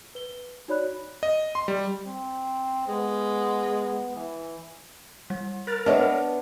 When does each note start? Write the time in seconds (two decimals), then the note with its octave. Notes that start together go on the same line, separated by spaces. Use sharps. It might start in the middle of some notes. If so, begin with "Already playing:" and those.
0.15 B4 G7
0.68 D#4 F#4 C#5 D5 B5 F#6
1.23 D#5
1.55 C6
1.68 G3
2.06 C4
2.88 G#3 B3
4.16 E3
5.30 G3
5.67 A#4 B5 F#6 A6
5.86 B3 D4 C#5 D#5 E5 A5